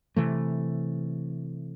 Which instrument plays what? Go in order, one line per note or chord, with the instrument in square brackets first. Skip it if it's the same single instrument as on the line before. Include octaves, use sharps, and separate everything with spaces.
[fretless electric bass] C3 E3 A3